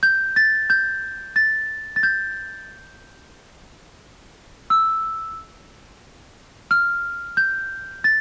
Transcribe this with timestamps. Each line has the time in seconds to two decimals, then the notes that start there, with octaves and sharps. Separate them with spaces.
0.03 G6
0.36 A6
0.70 G6
1.36 A6
1.96 A6
2.03 G6
4.70 E6
6.71 F6
7.37 G6
8.04 A6